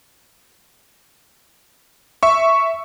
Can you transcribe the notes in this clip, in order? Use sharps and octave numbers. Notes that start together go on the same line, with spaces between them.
E5 C#6